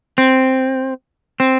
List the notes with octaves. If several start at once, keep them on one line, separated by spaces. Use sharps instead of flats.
C4
C4